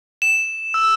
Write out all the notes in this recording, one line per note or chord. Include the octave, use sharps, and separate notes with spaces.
E7
E6